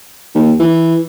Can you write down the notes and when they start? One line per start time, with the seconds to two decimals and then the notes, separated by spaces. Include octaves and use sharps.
0.35 D#2
0.59 E3